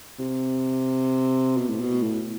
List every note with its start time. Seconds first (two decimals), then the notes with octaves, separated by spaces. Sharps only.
0.19 C3
1.57 B2
1.69 A2
1.80 B2
2.03 A2